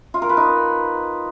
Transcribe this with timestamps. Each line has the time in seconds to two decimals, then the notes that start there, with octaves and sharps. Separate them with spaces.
0.14 F4
0.22 A#4
0.29 B4
0.37 D#4